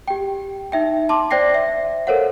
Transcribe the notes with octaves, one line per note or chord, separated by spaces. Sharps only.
G4 G5
D#4 E5 G5
A5 C6 D6
C5 D5 G5 A#6 C7
E5
A4 A#4 C5 C#5 F5 F#5